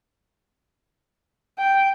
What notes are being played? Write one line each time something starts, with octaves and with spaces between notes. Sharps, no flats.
G5